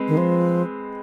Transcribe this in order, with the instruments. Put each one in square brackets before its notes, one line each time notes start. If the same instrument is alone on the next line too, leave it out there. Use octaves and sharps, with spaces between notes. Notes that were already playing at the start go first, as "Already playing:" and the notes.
Already playing: [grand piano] G#3 C4 B4
[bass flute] D#3
F3